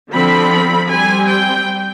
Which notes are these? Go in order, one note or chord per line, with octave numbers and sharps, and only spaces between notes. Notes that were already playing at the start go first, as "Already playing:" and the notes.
D3 F3 C4 B5
G3 C4 G#5
G5